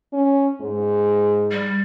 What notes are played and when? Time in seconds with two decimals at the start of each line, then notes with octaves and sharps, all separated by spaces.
0.13 C#4
0.61 G#2
1.51 G3